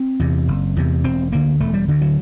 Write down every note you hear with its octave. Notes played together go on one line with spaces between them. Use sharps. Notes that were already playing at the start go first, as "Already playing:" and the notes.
Already playing: C4
E2 C3
F#1
E2 C3
E1 C4
D2 D3 A#3
E1 A3
G3
D2 D3
F#3